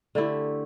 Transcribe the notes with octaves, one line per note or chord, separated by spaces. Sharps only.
D3 A3 E4 G4